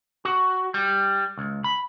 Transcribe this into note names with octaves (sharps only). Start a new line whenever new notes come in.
F#4
G3
C#2
B5